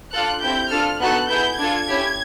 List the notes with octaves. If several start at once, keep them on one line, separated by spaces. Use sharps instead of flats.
D4 F4 A4 F#6
C4 E4 G4 G6
D4 F4 A4 F6
B3 D#4 F#4 A4 F#6
B3 E4 G#4 G6
D4 F4 A4 G#6
C#4 E4 G4